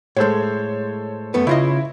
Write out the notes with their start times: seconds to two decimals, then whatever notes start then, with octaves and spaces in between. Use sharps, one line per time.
0.17 A2 G#3 A4 C5 C#5
1.34 F#2 A3 B3
1.47 C#3 E4 F4 D#5